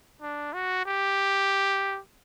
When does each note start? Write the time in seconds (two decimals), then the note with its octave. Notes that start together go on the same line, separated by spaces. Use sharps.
0.22 D4
0.53 F#4
0.86 G4